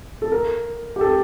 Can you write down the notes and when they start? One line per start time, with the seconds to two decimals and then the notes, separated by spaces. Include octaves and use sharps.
0.22 A4
0.32 A#4
0.96 G4
1.01 A4